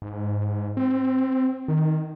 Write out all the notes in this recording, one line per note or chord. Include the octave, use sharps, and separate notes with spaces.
G#2
C4
D#3